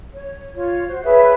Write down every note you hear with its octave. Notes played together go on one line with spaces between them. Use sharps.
C#5
F4 C#5
F#4 C5
G#4 B4 C#5 E5